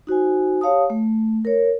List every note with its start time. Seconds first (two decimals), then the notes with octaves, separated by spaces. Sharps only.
0.07 D#4 F#4 C5 G#5
0.61 G4 C#5 F5 A5 D#6
0.90 A3
1.45 A#4 C#5